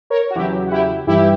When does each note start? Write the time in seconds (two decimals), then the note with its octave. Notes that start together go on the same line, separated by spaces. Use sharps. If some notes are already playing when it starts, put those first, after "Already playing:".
0.10 A#4 C#5
0.30 F#4
0.35 E2 C#3 F#3 E4 G4
0.67 F#4
0.71 E4 G4
1.06 G2 E3 G3 E4 G4